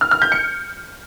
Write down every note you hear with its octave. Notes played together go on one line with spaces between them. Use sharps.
F6
F6
G6
C#7